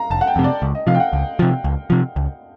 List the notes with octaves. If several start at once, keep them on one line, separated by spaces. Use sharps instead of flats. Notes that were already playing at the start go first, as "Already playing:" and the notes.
Already playing: F5 A#5
F1 A5
F#5
G5
F2 C3
D5
C#2
D#5
C3 F3 F5
G5
F#5
C#2
C3 F3
C#2
C3 F3
C#2